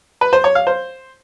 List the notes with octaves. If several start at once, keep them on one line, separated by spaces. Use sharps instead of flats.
B4
C5
C#5
F5
C5